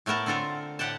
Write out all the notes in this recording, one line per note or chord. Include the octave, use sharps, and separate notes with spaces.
A2 A3 B3 A#4 A5
D3 C4 F4 A4 A#4
A2 G4 F#5 G5 A5